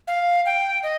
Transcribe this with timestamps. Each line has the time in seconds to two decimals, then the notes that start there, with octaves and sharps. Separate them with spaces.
0.07 F5
0.46 G5
0.83 D#5